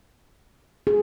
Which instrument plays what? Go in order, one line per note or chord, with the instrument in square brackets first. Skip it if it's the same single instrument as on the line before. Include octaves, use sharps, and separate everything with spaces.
[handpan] G#4